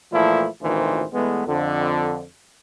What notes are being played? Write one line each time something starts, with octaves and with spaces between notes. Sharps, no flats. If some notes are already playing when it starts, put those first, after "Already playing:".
A#2 E3 F3 A3 E4
G#1 D2 A#2 D#3 E3 C5
E2 G#3 A3 B3
F2 D3